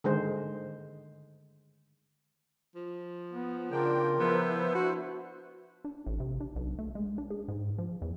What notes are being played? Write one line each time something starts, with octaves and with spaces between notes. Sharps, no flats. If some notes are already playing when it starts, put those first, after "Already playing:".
D3 D#3 G#3 G#4 C5
F3
B3
C#3 D4 F4 A#4 G5
F3 B3 E4 B4 C5
D4 F#4
D4
A1
C3
D4
B1
A3
G#3
D4
G#4
G#2
F3
E2